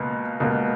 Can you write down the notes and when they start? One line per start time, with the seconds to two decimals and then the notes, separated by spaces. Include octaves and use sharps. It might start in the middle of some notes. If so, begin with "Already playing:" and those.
Already playing: C#2 B2 A#3
0.40 C#2 B2 A#3